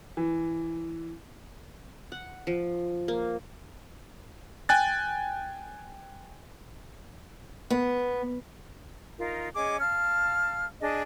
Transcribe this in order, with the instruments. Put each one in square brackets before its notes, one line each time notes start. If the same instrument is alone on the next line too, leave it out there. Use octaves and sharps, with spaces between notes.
[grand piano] E3
[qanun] F#5
F3
A#3
[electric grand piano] G5 G#5 F#6 A6
[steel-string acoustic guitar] B3
[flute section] D#4 F4 A#4
C#4 G#4 D#5 D6
F5 A5 F6
D4 G#4 D#5